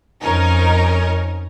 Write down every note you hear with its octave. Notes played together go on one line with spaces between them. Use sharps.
F2 C#4 D#4 A#4